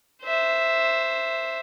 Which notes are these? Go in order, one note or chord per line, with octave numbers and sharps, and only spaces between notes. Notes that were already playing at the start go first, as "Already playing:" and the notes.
C5 E5